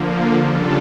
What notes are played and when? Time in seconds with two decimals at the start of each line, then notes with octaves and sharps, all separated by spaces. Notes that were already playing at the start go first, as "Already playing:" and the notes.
Already playing: D3 F3 A#3
0.35 C#3 G3 D4 F4 A4